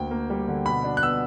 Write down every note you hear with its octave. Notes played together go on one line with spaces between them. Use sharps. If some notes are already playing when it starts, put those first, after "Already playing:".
Already playing: D2 A#3 G5
A#3
G3
D3
B2 B5
D4
F#6
B3 E6